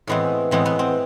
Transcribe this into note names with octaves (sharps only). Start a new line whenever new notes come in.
A2 E3 G#3 B3 C4
A2 E3 G#3 B3 C4
B3
C4